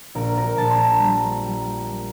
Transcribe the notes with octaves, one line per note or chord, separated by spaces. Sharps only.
A#1 A#4
A#4
A#1 A5
C6
A#5
G3 A#5
G3
A#3